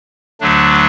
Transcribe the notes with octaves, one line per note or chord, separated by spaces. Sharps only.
D2 D3 F#3 A3 D4